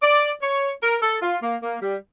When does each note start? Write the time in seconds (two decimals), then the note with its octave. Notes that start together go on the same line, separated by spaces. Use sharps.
0.02 D5
0.42 C#5
0.82 A#4
1.02 A4
1.22 F4
1.42 A#3
1.62 A#3
1.82 G3